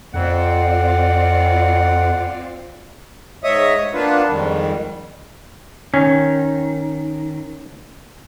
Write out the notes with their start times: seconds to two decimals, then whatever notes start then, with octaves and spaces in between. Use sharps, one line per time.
0.14 F2 C4 F4 D5 F#5
3.44 G#2 C#5 D#5 E5 D#6
3.94 A#3 B3 D4 F4 B4
4.29 F2 G#2 D#3 G3
5.94 D#3 C#4